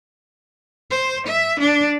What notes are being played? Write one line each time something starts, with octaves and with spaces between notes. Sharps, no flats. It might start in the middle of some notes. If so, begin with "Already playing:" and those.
C5
E5
D4